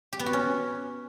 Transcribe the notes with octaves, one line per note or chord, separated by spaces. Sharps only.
G4
B3
F#4
C#4